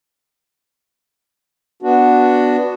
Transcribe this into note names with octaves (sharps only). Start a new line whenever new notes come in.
B3 D4 F#4